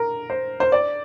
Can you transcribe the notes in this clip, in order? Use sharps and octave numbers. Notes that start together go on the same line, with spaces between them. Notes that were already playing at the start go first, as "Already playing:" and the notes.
Already playing: A#4
C5
C5
D5